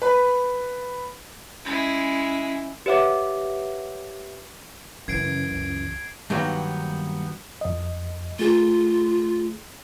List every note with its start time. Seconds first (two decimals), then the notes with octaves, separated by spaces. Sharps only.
0.02 B4
1.65 G#3 C#4 E4
2.86 G4 B4 C#5 E5 F#5 D6
5.08 F#2 C#3 E3 G#6 C7 D7
5.51 C#2
6.30 G2 D#3 F#3 A#3 B3
7.61 F2 D#5
8.39 A3 F4 G#4